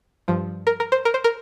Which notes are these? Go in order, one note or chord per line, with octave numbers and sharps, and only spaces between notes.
G2 F3
A#4
A#4
C5
A#4
C5
A#4